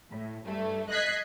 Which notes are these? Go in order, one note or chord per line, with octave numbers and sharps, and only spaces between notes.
A2
G2 A3
D#5 F#6 G#6 B6 C7